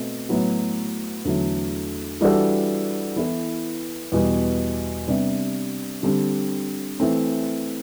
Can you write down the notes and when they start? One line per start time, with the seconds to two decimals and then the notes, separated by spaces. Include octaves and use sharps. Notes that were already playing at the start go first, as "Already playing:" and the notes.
Already playing: B2 A3 C4
0.29 A2 F#3 B3 F#4
1.25 E2 D3 F#3 A3
2.21 E3 G3 D4 F#4 A4
3.16 E3 B3 E4 A4
4.12 E2 B2 G3
5.08 C3 G3 B3 D4
6.03 D3 G3 C4 G4
7.00 E3 A3 C4